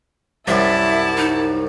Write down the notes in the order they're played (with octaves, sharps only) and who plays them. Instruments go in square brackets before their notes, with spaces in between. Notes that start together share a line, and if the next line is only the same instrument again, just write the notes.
[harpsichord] C2 F#2 [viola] E4 A5 [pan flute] E5
[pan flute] D#4